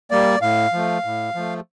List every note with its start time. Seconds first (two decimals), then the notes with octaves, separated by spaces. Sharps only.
0.11 G3 A#3 D5
0.42 A2 F5
0.73 F3 A3
1.04 A2
1.35 F3 A3